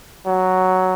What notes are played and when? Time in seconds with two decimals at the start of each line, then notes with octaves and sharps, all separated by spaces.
0.26 F#3